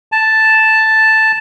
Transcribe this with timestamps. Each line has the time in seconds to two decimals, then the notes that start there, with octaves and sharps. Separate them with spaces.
0.12 A5